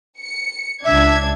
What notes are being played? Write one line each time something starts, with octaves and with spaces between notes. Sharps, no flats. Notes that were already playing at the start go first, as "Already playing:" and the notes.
C#7
C#2 D4 E5 G#6